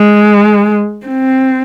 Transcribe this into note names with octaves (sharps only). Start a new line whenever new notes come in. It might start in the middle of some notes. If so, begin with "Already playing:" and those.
Already playing: G#3
C4